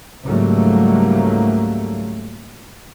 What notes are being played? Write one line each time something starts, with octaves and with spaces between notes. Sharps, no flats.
C#2 G#2 F#3 G3 A3 A#3